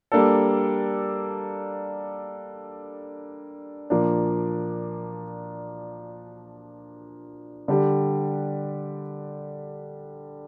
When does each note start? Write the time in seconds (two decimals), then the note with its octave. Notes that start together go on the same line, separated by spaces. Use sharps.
0.12 G3 A#3 D4 A4
3.90 A#2 F3 A#3 D4
7.68 D3 G3 D4 G4